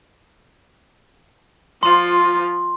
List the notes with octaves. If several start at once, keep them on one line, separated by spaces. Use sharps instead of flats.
F3 F4 C6